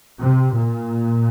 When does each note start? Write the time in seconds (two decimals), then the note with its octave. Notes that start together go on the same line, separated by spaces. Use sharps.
0.21 C3
0.55 A#2